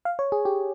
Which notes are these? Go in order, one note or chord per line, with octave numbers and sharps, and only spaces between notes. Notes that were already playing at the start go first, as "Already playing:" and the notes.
F5
C#5
G#4
G4